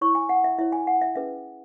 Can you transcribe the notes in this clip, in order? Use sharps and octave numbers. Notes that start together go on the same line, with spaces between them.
E4 C#5 C#6
G#5
F#5
E5
E4 C#5 E5
G#5
F#5
E5
C#4 G#4 B4 E5